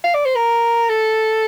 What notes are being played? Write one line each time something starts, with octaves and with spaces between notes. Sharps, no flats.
F5
D5
C5
A#4
A4